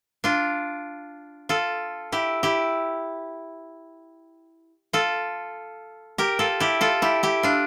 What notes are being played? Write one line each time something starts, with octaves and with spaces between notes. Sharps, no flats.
D4 F4
F4 A4
E4 G4
E4 G4
F4 A4
G4 A#4
F4 A4
E4 G4
F4 A4
E4 G4
E4 G4
D4 F4